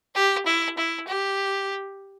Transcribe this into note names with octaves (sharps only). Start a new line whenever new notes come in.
G4
E4
E4
G4